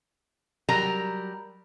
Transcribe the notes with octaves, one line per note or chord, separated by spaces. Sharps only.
F#3 G3 A#4 A#5